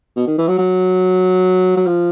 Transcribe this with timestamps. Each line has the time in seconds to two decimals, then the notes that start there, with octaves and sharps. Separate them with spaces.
0.16 B2
0.27 D#3
0.38 E3
0.48 F#3
0.59 F#3
1.77 F#3
1.87 F3